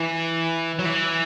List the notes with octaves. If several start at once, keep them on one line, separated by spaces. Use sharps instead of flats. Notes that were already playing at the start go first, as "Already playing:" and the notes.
Already playing: E3
F#3
E3